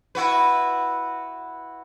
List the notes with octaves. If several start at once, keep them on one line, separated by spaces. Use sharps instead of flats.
E4 F#4 B4